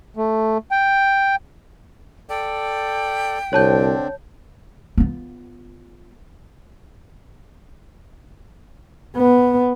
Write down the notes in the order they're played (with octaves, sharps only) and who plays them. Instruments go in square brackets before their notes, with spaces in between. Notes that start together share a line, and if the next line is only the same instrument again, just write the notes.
[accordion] A3
G5
[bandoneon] A4 D5 [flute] G5
[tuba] C2 [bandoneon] D3 C4 D4 [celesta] C#5 A5 G6
[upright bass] B3 F4
[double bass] B3